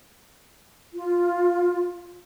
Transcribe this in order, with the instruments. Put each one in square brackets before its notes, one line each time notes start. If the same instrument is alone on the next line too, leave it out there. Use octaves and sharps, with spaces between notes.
[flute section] F4